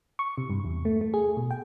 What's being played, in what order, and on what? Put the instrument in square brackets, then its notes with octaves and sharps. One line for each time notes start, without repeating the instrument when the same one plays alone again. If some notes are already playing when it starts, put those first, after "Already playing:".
[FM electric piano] C#6
C3
G2
E2
A3
A3
G#4
B2
G5